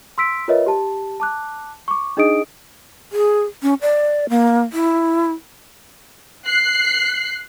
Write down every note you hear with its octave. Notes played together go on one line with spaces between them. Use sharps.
C6 E6 B6 D7
F4 A#4 B4 C#5 D#5 E5
G4 A5
A5 D6 F#6
C#6 D6
D4 D#4 G#4 D#5 D#6 D7
G#4
C#4
D5
A#3
E4
F#6 C7